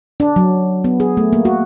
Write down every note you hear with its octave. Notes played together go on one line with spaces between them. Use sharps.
D4
F#3
B3
G#4
A3
A#3
F#4